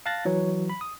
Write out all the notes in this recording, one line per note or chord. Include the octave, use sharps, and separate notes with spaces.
F5 A5 F#6 A6 A#6
E3 F#3 C#5
B5
D#6